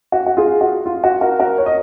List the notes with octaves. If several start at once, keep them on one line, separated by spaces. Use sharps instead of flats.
F#4
F#4
F4 G#4
F#4
F4
F#4
F#4 A#4
F#4 A#4
C#5
D#5